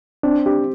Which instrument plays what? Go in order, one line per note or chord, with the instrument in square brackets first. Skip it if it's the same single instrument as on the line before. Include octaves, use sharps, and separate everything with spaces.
[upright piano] C4 [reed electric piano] D4
[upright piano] G4